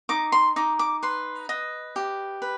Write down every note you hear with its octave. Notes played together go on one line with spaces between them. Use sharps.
D#4 D6
C6
D#4 D6
D6
B4 C6
B4 D#5
G4
B4